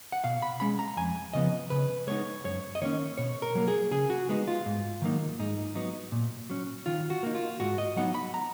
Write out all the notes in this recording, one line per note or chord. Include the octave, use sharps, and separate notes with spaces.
F#5
B2 F5
B5
G#3 C#4 B5
A#5
F2 G#5
C#3 F3 B3 D#5
C#3 B4
G#3 B3 D#4 C#5
F#2 C#5
D#5
D#3 A#3 C#4 C#5
B2 C#5
A#4
F#3 A#3
G#4
C#3 G#4
F#4
G#3 B3 D#4
F4
G#2
D#3 F#3 A#3 D#4
G#2 D#4
F#3 B3 D#4
A#2
F#3 C#4
D#3 F4
F#4
A#3 D#4
F4
G#2 F#4
D#5
F#3 B3 D#4 F#5
B5
A#5